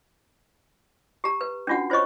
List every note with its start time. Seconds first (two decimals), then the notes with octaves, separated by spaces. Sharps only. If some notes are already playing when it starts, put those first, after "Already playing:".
1.24 G4 A#5
1.41 B4
1.67 C#4 D4 F4 F#4 F#5
1.90 F4 C5 C#5 D#5 C#6